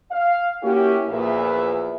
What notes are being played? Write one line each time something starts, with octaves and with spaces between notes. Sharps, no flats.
F5
A#3 C#4 E4 F#4 G4
A#1 E2 A#2 G#4 B4 E5